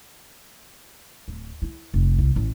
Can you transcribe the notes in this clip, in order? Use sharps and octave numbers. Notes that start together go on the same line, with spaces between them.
D1
E4
F1
C2
A1